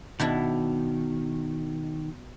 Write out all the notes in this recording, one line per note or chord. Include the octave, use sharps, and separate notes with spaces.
B2 D#3 D4 E4